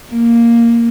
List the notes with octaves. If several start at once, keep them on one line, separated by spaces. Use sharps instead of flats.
A#3